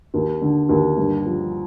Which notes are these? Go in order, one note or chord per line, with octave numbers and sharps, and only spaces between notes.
D#2
D3
D#2
G2
F3